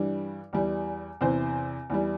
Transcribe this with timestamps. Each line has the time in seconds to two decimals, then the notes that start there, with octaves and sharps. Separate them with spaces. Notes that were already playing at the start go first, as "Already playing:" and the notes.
Already playing: G2 E3 G3
0.53 E2 E3 G3
1.21 E2 C3 E3 C5
1.90 E2 E3 G3